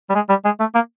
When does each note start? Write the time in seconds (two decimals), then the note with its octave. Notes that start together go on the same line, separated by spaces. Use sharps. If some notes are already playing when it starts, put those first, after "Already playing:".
0.10 G3
0.15 G#3
0.29 G3
0.45 G#3
0.60 A3
0.75 A#3